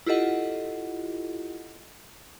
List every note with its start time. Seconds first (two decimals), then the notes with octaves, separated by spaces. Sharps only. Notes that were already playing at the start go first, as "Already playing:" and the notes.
0.06 E4 F4 G4 A4 D#5 F#5